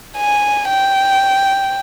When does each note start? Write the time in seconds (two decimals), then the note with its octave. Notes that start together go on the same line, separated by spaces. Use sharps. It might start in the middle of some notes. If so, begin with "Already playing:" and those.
0.17 G#5
0.70 G5